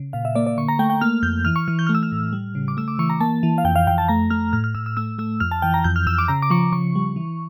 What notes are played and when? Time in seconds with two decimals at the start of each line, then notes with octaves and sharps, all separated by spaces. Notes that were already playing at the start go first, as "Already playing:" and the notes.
Already playing: C#3
0.13 A#2 F5
0.25 E5
0.35 A#3 D5
0.47 D5
0.58 D3 C#6
0.68 A#5
0.79 A3 G5
0.90 G5
1.01 A#3 F6
1.23 F2 G6
1.45 E3 F6
1.56 C#6
1.68 E3 F6
1.79 G6
1.87 A3 F6
1.95 E6
2.03 F6
2.12 A2
2.33 G3
2.55 C#3
2.68 D6
2.77 A3 E6
2.88 D6
2.99 E3 C#6
3.10 A#5
3.21 A#3 A5
3.43 E3
3.58 F5
3.65 F2 G5
3.76 F5
3.87 F2 G5
3.98 A5
4.08 A3 A#5
4.30 A3 F6
4.53 A2 F6
4.64 F6
4.75 A2 E6
4.86 E6
4.97 A3 E6
5.18 A3 E6
5.40 F2 F6
5.51 A5
5.62 E3 G5
5.74 A#5
5.84 F2 G6
5.96 F6
6.07 F2 E6
6.18 D6
6.28 C#3 A#5
6.42 D6
6.50 F3 C#6
6.72 C#3 C#6
6.95 G3
7.16 E3